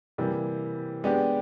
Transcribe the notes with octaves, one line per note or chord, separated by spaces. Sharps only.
C3 E3 G3 A#3
G#3 B3 D4 G4